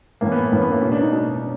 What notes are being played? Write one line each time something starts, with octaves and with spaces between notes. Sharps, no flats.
A2 E3 A#3
B3
A2 E3 C#4
B3
A#3
B2 C#4
D4
D#4
B2 D4